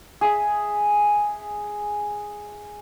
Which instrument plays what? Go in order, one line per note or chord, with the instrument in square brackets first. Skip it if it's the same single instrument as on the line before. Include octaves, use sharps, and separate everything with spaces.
[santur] G#4 E5